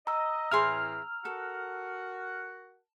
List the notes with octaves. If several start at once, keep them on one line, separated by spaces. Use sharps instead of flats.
D#5 A#5 E6
A2 E3 C4 E4 G#4 C6 F6
F#4 A4 A#4 F#5